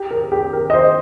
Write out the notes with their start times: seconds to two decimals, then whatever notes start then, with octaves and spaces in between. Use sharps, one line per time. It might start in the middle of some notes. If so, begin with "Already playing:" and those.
Already playing: G4
0.11 A#4
0.32 G4
0.53 A#4
0.70 D#5
0.74 C5